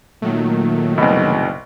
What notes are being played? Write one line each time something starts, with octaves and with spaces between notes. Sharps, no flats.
A#2 D#3 F#3 A3
F#1 C2 B2